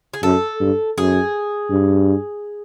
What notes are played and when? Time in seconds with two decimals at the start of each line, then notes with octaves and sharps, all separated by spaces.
0.14 G#4
0.23 F#2 A4
0.60 G2
0.97 F#2 G#4
1.70 G2